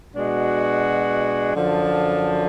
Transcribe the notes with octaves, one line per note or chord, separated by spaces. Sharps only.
B2 G#3 D4 F#4
F#2 D3 F3